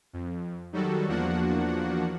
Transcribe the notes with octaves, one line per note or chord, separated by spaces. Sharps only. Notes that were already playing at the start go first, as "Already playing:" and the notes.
F2
D#3 F#3 G3 F#4 A4
E2 F3 A#3 D4 F#4 F#5